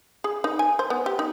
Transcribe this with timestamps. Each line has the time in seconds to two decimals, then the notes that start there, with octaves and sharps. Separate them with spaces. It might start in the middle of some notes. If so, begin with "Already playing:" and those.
0.24 G#4
0.44 D#4
0.59 G#5
0.79 C5
0.90 B3
1.06 G4
1.19 D#4